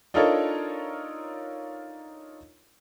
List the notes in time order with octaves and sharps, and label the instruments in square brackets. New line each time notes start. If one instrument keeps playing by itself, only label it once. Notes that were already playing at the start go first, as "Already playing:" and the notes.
[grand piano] D4 D#4 F4 A4 A#4 C#5